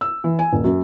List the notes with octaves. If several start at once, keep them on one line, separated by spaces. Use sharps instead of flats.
E6
E3
G#5
D#1
F#2